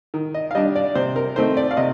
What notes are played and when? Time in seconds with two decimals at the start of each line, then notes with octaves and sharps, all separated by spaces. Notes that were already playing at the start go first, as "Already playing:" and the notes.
0.14 D#3
0.34 D#5
0.51 F5
0.55 G3 D4 D#5
0.76 D5
0.95 C3 C5
1.16 A#4
1.36 D#3 A3 C4 D#4 C5
1.57 D5
1.71 F5
1.77 C3 D#5